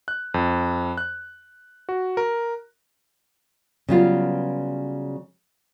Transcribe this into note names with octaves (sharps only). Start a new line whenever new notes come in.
F#6
F2
F#6
F#4
A#4
C#3 F#3 G3 B3 F4